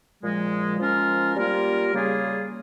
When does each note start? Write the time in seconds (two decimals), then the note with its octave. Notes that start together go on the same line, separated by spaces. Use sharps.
0.23 A#2 F3 G#3
0.79 F3 G#3 C#4 F4 A#4
1.36 G3 A#3 F4 A#4
1.92 C#3 G3 A#3 F4 G#4